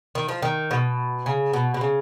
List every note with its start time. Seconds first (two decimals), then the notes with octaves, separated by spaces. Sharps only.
0.15 D#3
0.29 F3
0.42 D#3
0.71 B2
1.26 C#3
1.53 B2
1.74 B2
1.81 C#3